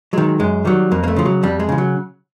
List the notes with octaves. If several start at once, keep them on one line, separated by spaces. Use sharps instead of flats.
D#3 F#3 G#3
F#2 G#3
D#3 F#3 G3
F2 A#3
A#3
A3
C#3 F3
F#3
F2 G3
G#3
C#3 F3
F#3